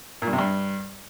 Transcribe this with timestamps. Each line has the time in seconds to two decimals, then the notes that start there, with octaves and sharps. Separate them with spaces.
0.22 A#2
0.27 G2
0.33 C3
0.38 G2